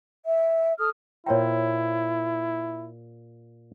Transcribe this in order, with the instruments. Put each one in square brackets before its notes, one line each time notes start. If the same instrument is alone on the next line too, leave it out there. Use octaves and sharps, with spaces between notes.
[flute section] E5
A4 D#6 F6
[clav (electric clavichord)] A#2 C5 A#5 [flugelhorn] E4 [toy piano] C#5 G5